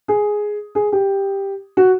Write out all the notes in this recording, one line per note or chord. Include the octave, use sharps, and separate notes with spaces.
G#4
G#4
G4
F#4